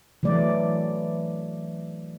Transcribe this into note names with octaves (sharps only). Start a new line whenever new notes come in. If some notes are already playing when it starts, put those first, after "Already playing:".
E3 F#3 A3 D5